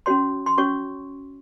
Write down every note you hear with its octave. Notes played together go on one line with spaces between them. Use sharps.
C#4 F#4 C#5 C6
C6
C#4 F#4 C#5 C#6